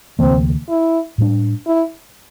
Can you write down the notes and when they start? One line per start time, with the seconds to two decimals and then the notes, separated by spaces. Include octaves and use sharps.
0.19 D2 C3 E3 A#3 C4
0.69 E4
1.18 A2 G3 D4
1.67 E4